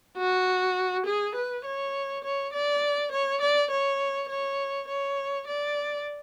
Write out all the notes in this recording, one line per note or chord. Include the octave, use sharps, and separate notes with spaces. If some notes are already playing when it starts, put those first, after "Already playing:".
F#4
G#4
B4
C#5
C#5
D5
C#5
D5
C#5
C#5
C#5
D5